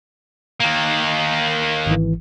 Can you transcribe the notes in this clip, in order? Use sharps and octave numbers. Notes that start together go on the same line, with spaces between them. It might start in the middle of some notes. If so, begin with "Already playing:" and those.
D#3 A#3
G#1 E3